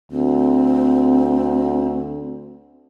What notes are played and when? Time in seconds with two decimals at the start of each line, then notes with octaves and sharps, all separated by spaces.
0.12 D2 C4